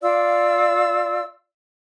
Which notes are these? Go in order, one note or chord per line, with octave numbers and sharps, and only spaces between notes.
F4 D5 F5 E6